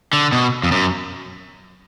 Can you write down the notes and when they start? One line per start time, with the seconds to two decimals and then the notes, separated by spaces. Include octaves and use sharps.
0.13 D3
0.32 B2
0.64 F2
0.71 F#2